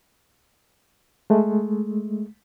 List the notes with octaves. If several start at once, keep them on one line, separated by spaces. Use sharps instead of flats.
G#3 A3